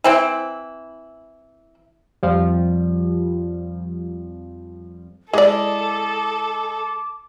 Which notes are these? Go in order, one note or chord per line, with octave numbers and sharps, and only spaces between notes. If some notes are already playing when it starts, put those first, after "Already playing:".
E3 C4 E4
F2 F3 G3
G#3 E4 G#4 A4 D5 D#5 D6